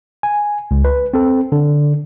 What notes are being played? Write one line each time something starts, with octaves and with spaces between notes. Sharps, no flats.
G#5
C#2
B4
C4 A4
D3